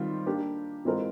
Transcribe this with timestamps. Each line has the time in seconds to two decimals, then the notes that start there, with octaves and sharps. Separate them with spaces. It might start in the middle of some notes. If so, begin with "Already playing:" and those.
Already playing: D#3 G3 C4 F4
0.26 A#3 D4 G4
0.85 E3 G#3 C4 F4 A#4